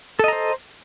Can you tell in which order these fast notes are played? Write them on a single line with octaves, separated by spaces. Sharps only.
A4 D#5 A#5 C5